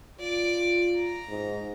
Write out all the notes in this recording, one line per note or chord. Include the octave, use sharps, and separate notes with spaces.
F4 D5 D7
A#5
G#2